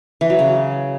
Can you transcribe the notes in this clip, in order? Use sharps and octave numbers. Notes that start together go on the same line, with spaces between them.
E3
F#3
C#3